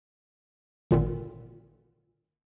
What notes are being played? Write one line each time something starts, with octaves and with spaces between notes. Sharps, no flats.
G#1 A#2 D3 D#3